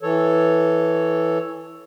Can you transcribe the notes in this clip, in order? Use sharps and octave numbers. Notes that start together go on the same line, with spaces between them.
E3 A4 C#5